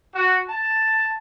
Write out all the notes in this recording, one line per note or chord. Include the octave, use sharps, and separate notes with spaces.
F#4
A5